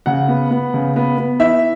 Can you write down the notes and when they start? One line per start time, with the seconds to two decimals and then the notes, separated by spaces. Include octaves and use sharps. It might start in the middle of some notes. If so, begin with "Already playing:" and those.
0.06 C#3 F#5
0.28 B3
0.51 B3
0.74 C#3
0.96 B3
1.18 B3
1.40 E3 E5